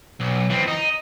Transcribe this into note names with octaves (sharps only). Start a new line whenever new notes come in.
B1
E3 C4
D#4